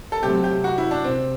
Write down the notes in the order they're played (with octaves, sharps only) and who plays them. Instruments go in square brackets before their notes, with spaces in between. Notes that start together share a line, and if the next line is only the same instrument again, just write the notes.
[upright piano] A4
[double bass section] C3 F#3 A3 C4 [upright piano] G4
[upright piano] G4
F#4
E4
D4
[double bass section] C3 [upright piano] C4